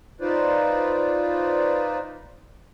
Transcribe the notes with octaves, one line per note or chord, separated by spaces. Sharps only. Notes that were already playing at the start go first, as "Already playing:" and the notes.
D#4 F4 B4 C5 D5